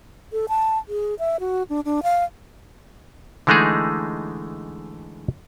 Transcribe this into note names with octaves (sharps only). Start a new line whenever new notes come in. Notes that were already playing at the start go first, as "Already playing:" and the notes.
A4
A5
G#4
E5
F#4
D4
D4
F5
D3 E3 G#3 A3 D#4 G#4